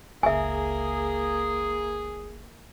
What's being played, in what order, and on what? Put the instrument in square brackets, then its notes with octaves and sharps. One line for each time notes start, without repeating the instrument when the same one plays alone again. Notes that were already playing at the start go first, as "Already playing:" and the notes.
[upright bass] F#1 C#2 [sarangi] A#3 [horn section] G#4 [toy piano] E5 G#5